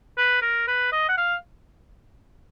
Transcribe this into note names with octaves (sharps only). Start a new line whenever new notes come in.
B4
A#4
B4
D#5
F#5
F5